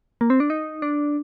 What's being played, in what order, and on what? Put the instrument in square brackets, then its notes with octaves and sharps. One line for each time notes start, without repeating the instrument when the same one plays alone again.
[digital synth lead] A#3
C4
D4
D#4
D4